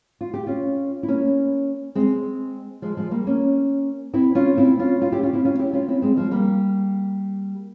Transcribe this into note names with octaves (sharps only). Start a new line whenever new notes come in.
F4
G4
C#4 F4
E4
A#3 C#4
G#3 C4
F3 G#3
F3 G#3
G3 A#3
A#3 C#4
C4 E4
C#4 F4
C4 E4
C#4 F4
C#4 F4
E4 G4
C#4 F4
C4 E4
C#4 F4
E4 G4
C#4 F4
C4 E4
G#3 C4
F3 G#3
G3 A#3